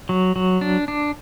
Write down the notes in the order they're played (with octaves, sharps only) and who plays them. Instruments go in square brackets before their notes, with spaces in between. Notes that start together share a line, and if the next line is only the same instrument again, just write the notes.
[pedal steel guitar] F#3
F#3
D4
D4